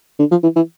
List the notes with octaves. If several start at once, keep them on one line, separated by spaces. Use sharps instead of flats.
D3
F3
E3
E3